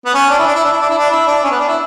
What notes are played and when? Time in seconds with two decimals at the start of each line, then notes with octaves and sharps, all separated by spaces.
0.05 B3
0.14 C#4
0.30 D4
0.38 E4
0.46 D4
0.55 E4
0.64 D4
0.72 E4
0.81 D4
0.89 E4
0.98 D4
1.10 E4
1.27 D4
1.43 C#4
1.51 B3
1.59 D4
1.68 E4